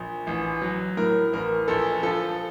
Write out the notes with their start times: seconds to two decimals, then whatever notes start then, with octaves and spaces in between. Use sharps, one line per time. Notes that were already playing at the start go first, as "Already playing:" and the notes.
Already playing: A#1
0.27 A1
0.62 F#3
0.97 A2 A#4
1.33 A1 A#4
1.68 A#1 A4
2.03 F3 A4